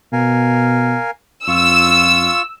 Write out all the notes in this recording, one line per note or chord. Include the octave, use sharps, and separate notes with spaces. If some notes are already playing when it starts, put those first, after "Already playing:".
B2 A#4 F5 G#5
F2 F4 C#6 E6